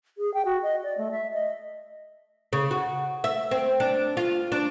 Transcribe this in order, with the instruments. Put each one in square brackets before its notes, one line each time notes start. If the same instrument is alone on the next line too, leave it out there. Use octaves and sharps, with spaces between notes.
[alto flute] G#4
G5
F#4
D#5
D5
A3
E5
D#5
[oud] C#3
F#4
E5
C4
D4
F4
D4